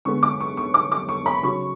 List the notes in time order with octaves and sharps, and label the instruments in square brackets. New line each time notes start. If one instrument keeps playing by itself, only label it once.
[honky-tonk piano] D3 G#3 B3 C#6
D6
C#6
C#6
D6
D6
C#6
B5
C#3 F#3 C#4 C#6